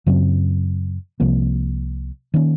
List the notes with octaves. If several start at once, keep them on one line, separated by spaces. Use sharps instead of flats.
F#2 C#3 F#3 C4
C2 C3 F3 A#3
D#3 A#3 C#4